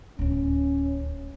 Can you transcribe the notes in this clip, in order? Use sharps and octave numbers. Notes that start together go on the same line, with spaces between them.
D1 D#2 C#4